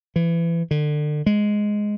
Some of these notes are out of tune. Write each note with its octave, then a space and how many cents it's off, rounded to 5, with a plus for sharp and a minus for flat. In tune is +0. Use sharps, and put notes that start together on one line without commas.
E3 +30
D3 +30
G#3 +5